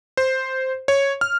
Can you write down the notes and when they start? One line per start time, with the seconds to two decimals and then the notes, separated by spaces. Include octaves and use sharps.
0.17 C5
0.88 C#5
1.21 F6